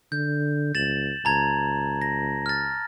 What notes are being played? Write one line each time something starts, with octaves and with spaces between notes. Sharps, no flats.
D3 G6
C#2 A6 E7 F#7
C#2 A5 A#5 G#6
A#6
F6 A6